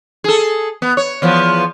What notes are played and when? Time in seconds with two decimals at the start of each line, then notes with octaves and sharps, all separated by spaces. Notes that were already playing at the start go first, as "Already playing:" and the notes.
0.24 G#4 A4
0.82 B3
0.97 C#5
1.22 E2 F3 B3